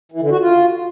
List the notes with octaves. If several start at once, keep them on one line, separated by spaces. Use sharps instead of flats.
E3
D3
F#4
F4